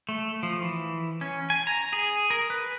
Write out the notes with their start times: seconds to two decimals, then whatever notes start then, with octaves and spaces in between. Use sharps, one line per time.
0.09 A3
0.43 F3
0.62 E3
1.21 C#4
1.50 G#5
1.67 A#5
1.93 G#4
2.30 A#4
2.50 B4